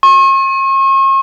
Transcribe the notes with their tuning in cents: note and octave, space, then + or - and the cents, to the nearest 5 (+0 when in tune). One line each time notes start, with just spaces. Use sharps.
C#6 -45